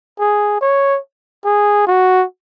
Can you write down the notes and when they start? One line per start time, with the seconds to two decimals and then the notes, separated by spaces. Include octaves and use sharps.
0.19 G#4
0.61 C#5
1.45 G#4
1.87 F#4